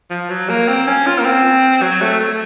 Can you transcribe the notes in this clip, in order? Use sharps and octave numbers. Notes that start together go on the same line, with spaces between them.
F3
F#3
A#3
C4
C#4
F4
A#3
C4
F#3
A3
A3